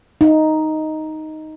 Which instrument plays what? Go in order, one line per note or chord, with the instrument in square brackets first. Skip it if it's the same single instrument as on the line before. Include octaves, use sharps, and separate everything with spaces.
[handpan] D#4